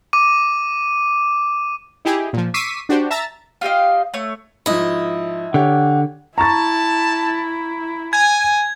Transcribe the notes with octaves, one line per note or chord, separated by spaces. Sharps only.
D6 D#7
D#4 E4 G4 G#4
A#2 F3
C#6 D6 E6 B6 C7 D#7
D4 F#4 G4 C5
E5 A5 A#5 E6 A6
F4 G4 D#5 F5
A3 C#5
G#2 F3 E4 D#5
D3 G4 C#5 F#5
E4 A5 A#5 C#6 A6
G#5 G#6